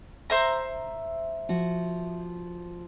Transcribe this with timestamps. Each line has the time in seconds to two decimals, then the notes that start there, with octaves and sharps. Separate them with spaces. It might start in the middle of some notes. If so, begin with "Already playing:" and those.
0.30 C5 E5 A#5
1.49 F3 F#4